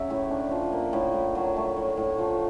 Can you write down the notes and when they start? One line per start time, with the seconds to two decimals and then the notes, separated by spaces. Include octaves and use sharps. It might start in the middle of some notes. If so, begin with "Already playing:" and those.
Already playing: C#3 F#3 E5
0.10 A2
0.31 D4
0.51 F3
0.72 A#3
0.93 A2
1.14 A2
1.35 F#3
1.56 A3
1.76 A2
1.97 A2
2.18 F3